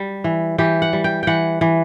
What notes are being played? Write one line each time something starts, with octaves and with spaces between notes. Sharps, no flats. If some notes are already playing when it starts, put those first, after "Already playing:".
Already playing: G3
E3
E3 G4
F#5
G3
G5
E3 F#5 G5
E3